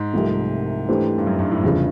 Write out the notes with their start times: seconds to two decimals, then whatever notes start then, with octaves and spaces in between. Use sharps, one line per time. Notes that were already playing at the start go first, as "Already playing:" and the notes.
Already playing: G#2
0.14 C2 C3 F3 A3
0.89 E3 A3 D4 G4 C5
1.18 G2
1.27 F#2
1.39 G2
1.51 A2
1.64 F1 E2 G2 C#3 F3